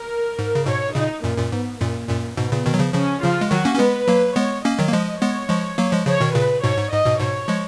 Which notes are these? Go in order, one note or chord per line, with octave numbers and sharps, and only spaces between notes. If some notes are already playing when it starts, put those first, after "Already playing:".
Already playing: A#4
G#2
C#3
G#2 B2 C#5
A#2 C#3 D#4
F#2 A#2 A#3
F#2 A#2
G#2 B3
F#2 A#2 A#3
F#2 A#2
G#2 B2 B3
A#2 C#3
B2 D#3
F#3
C#3 F3
C#3 F3 C#4
C#3 F3 F4
G#3
D#3 F#3 F#4
A#3 C#4
C#4
G#3 B3 B4
F#3 A#3
G#3 B3 C#5
A#3 C#4 D#5
D#3 F#3
A#3
F3 G#3 D#5
G#3 B3 C#5
F3 G#3
F#3 A#3
F3 G#3
C#3 F3 C#5
B2 D#3
A#2 C#3 B4
G#2 B2 C#5
G#2
G#2 D#5
G#2 B2
G#2 B2 C#5
F3 G#3